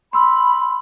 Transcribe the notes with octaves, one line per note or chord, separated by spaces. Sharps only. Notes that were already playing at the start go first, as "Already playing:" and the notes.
B5 C6 E6